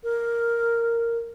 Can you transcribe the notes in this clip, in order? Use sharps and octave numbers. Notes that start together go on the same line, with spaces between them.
A#4